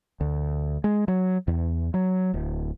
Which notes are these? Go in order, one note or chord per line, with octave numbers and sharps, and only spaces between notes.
D2
G#3
F#3
E2
F#3
D1